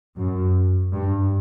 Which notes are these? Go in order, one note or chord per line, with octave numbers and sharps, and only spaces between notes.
F#2
G2